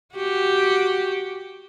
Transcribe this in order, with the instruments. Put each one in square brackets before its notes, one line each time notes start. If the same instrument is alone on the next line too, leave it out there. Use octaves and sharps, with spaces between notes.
[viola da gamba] F#4 G4